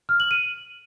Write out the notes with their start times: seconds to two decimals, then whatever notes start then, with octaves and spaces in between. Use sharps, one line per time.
0.09 F6
0.20 F#7
0.31 D#7